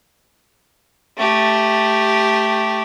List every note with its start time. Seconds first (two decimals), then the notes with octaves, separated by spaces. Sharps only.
1.18 A3 G4